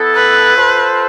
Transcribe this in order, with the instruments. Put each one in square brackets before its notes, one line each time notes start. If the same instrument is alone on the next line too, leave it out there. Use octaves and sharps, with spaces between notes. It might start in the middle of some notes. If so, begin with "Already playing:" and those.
Already playing: [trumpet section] B3 E4 A4
[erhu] B4
[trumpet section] F4 A4 C5